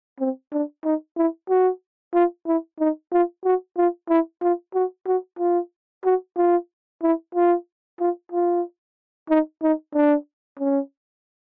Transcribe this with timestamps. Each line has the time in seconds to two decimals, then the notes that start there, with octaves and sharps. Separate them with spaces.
0.20 C4
0.52 D4
0.84 D#4
1.17 E4
1.49 F#4
2.14 F4
2.46 E4
2.79 D#4
3.12 F4
3.44 F#4
3.77 F4
4.09 E4
4.42 F4
4.74 F#4
5.06 F#4
5.39 F4
6.05 F#4
6.36 F4
7.02 E4
7.34 F4
8.00 F4
8.32 F4
9.29 D#4
9.62 D#4
9.94 D4
10.59 C#4